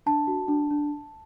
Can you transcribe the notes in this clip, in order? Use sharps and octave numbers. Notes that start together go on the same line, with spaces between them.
D4 A5
F#4
D4
D4